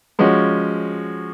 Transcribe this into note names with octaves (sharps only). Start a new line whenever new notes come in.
F3 G#3 C#4 F#4